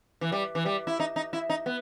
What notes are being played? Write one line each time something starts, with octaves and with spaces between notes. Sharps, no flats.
E3
G3
E3
G3
E4
D#4
D#4
E4
D#4
B3